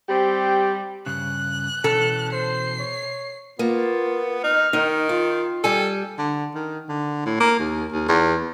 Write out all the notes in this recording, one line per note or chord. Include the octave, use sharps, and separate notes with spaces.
G3 C4 G4
G2 C#3 F#6
B2 E3 C#4 A4 A5
C5 C7
C#5
A#3 B3 F4
D#4 F6
D#3 D#4
F4 F5
G3 A4 G5 G#5
D3
D#3
D3
A2
A#3
D#2
D#2
E2